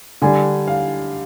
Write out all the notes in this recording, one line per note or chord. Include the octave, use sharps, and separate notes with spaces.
D3 G3 D4 G#5
F5